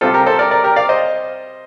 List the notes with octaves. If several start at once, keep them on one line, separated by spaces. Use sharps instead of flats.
C3 G3 C4 F4 A4
G4 A#4
A4 C5
A#4 D5
A#4 D5
G4 A#4
D5 F5
C5 D#5